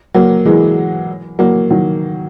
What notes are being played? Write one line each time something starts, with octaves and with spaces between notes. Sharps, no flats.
F#3 A#3
E3 G#3
F#3 A#3
D#3 F#3